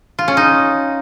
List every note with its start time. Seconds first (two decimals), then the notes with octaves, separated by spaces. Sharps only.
0.19 F4
0.28 C#4
0.37 D#4